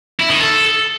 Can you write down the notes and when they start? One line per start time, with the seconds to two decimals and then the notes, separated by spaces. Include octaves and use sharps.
0.20 E4
0.30 D#3
0.41 A4